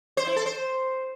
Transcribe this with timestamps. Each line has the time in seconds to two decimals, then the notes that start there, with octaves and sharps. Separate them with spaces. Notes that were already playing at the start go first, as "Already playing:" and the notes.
0.17 C5
0.27 E4
0.36 A4
0.46 C5